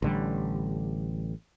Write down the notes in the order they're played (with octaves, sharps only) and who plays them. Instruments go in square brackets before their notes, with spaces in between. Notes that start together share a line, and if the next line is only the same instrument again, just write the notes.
[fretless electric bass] A1 D3 G3